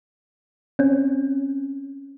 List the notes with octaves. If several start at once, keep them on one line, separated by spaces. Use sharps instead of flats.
C4 C#4